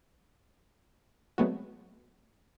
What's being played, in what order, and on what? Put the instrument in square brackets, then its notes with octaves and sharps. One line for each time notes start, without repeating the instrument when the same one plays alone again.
[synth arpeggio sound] F#3 G#3 A3 B3 C4 F#4